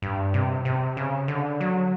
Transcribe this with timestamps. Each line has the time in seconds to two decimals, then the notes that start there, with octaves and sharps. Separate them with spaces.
0.02 G2
0.34 C3
0.65 C3
0.97 C#3
1.28 D3
1.60 F#3